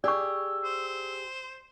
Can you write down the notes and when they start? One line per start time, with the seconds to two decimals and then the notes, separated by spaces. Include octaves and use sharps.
0.04 G4 G#4 D5 C#6 E6
0.65 C5